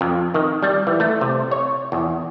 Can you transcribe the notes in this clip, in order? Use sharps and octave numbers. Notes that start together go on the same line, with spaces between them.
F2
D#3
G3
E3
A3
C3
C#5
E2